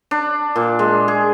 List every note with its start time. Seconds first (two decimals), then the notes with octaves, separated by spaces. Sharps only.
0.11 D4
0.56 A#2
0.79 G#3
1.08 G#4